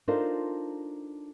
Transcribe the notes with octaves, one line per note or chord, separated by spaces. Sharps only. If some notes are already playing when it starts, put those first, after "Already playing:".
D4 D#4 F4 A4 A#4 C5